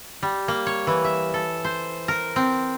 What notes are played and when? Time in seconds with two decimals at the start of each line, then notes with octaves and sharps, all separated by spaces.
0.23 G3
0.48 A#3
0.67 C#5
0.87 E3
1.05 E5
1.34 A4
1.64 C5
2.08 A#4
2.36 C4